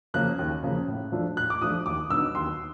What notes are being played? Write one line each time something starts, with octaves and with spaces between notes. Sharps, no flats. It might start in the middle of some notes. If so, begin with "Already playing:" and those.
C#3 F3 A#3 C#4 F#6
D#2
C#3 F3 A#3 C#4
A2
F3 A3 D4 F4
A2 F#6
D6
F3 A3 D4 F4 D#6
D#2 D6
D3 F#3 B3 D#4 E6
D#2 C6